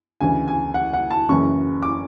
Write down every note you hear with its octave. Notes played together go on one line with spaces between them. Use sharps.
D2 C#3 E3 G#5
G#5
F#5
F#5
A5
F#1 F#2 C#3 E3 C#6
D6